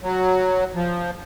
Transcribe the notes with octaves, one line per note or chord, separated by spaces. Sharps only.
F#3
F3